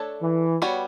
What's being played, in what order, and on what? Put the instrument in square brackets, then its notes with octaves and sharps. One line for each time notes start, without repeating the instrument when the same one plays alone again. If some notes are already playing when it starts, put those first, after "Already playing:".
Already playing: [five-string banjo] A3 D4 A4 C#5
[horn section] E3
[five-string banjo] G3 B3 F#4 C#5